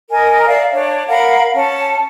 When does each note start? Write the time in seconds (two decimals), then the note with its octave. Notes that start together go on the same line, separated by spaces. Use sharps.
0.11 A#4 D#5 G#5
0.48 D5 E5 F5
0.74 D4 C#5
1.08 A#4 F5 F#5 B5
1.54 C#4 A5